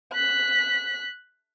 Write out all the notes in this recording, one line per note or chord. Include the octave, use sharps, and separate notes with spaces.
F#6 B6